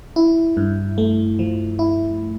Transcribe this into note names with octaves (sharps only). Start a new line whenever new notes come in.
E4
G2
A3
F3
E4